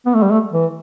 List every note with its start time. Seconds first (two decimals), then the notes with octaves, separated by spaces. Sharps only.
0.06 B3
0.14 A3
0.22 G3
0.31 A3
0.52 E3